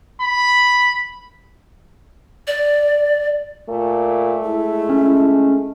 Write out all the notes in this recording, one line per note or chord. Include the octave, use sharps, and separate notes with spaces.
B5
D5
A#2 A3
G#3 E4
C#4